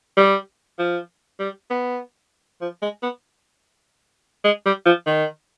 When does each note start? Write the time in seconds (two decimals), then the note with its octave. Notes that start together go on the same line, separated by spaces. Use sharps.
0.17 G3
0.79 F3
1.40 G3
1.70 B3
2.61 F3
2.82 G#3
3.03 B3
4.45 G#3
4.66 G3
4.86 F3
5.06 D#3